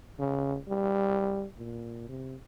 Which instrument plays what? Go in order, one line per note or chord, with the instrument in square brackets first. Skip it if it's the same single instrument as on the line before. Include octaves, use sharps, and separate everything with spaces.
[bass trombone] C#3
G3
A#2
C3